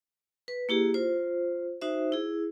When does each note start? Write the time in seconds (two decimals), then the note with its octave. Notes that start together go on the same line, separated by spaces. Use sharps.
0.48 B4
0.69 A#3 E4 G4 G#4
0.94 F4 C5
1.81 D#4 F#4 C5 E5
2.12 E4 G#4